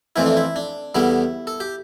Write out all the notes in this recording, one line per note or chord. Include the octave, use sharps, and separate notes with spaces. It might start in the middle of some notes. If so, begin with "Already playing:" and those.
F2 E3 A3 C4 E4
D4
E4
D4
E2 D3 G3 B3 E4
A4
G4